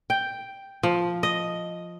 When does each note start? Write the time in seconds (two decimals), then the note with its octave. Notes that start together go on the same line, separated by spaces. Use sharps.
0.10 G5
0.83 F3
1.23 D#5